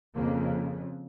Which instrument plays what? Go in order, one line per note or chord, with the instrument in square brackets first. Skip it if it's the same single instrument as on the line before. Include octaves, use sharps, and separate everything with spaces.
[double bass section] F2 C#3 A#3